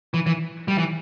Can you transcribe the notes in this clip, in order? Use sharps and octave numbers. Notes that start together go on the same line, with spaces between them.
E3
E3
G3
E3